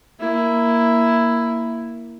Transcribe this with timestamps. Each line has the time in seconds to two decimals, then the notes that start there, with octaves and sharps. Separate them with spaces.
0.19 A#3 E4